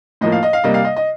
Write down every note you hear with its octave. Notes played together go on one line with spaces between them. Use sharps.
A2 F3 A#3 D#5
F5
D#5
F5
C3 G3 A#3 D#5
F5
D#5
D#5